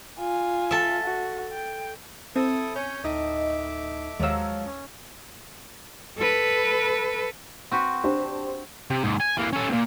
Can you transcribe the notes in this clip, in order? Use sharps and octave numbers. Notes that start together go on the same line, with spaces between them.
F4 G#5
A4 E5
F#4
G5
C4 E4 A4 D#6
C#4 C#5 G6
D2 A2 D#4 D#5 E5 D6
D#2 F3 F#3 G#3 C#5 F5 E6
C#4
A4 B4
C4 F#4 B4
D4 G4 C5
C3
D#2 G#2
G#5
E3 A#3
C#4 A4
D#2 A#2